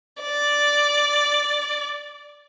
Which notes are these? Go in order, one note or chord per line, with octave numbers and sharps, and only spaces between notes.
D5